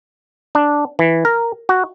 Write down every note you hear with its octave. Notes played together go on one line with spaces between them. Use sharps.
D4
E3
A#4
F#4